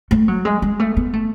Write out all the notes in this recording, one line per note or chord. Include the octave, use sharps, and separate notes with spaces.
A3
F#3
G#3
G#3
A3
B3
A3